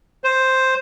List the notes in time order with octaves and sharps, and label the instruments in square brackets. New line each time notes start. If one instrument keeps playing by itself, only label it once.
[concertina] C5